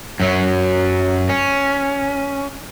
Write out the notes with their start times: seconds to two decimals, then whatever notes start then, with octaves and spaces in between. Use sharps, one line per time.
0.20 F#2 F#3
1.29 C#4